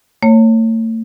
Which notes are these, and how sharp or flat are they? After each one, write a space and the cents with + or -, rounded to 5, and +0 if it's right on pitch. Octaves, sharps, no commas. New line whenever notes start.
A3 +40 C#5 -10